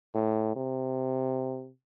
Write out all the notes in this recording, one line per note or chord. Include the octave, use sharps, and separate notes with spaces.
A2
C3